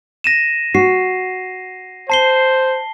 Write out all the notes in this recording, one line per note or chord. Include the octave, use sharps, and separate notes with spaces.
A#6 D#7 E7
F#4 C7
C5 A5 C7 G7